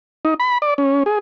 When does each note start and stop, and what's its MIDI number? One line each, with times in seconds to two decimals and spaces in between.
0.25 0.34 63
0.40 0.58 83
0.62 0.74 74
0.78 1.03 61
1.06 1.19 68